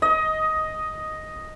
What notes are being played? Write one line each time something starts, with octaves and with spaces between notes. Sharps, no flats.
D#5